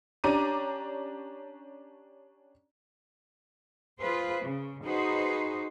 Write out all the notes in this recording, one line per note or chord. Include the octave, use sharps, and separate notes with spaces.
C#4 D4 G4 A#5 D6 D#7
F4 G#4 B4 C5
C#3
D#4 F#4 G#4 B4 C5